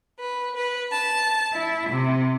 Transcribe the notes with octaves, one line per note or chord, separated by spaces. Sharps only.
B4
B4
A5
E4
C3